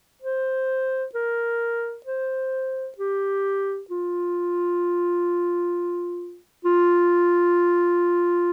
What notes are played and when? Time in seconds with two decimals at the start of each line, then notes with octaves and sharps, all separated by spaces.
0.22 C5
1.15 A#4
2.06 C5
2.98 G4
3.90 F4
6.65 F4